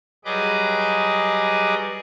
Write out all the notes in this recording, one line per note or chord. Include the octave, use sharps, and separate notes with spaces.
F#3 G3 G#4 B4 D#5 D6